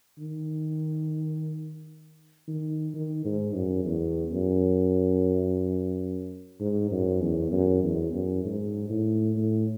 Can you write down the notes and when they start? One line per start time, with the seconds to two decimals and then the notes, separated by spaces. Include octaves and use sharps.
0.19 D#3
2.48 D#3
2.94 D#3
3.25 G#2
3.55 F#2
3.85 E2
4.31 F#2
6.60 G#2
6.91 F#2
7.21 E2
7.52 F#2
7.84 E2
8.13 F#2
8.45 G#2
8.90 A2
9.37 A2